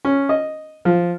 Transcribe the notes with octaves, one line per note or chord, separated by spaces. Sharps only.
C#4
D#5
F3